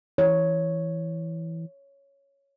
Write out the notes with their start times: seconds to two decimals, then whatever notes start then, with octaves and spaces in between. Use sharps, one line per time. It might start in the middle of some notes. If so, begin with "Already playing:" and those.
0.18 E3 C#5